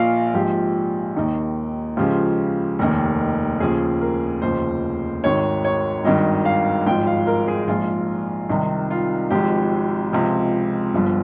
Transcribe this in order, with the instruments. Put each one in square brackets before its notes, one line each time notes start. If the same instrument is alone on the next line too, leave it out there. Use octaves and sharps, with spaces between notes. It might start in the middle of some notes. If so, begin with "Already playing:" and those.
Already playing: [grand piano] A#1 A#2 F3 D#5 F5
A#1 G#2 F3 G4
D#2 D#3 D#4
C#2 C#3 F3 G4
F1 D#2 D#3
D#2 C#3 F3 G#4
A#4
F1 D#2 C#3 F3 C5
G#1 G#2 D#3 C#5
C#5
G#1 G2 D#3 D#5
F5
G#1 G#2 F3 G5
F5
A#4
G#4
A#1 G#2 F3 F4
C2 C3 D#3 D#4
F4
G#1 G#2 F3 G4
C#2 C3 F3
G1 G2 F3